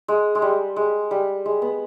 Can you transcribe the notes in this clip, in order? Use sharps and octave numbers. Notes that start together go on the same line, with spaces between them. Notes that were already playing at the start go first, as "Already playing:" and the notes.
G#3
G#3
G3
G#3
G3
G#3
B3